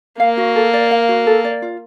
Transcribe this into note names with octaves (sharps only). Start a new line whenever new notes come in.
A#3 F5
F#4
A4
D5
F5
F#4
A4
D5
F4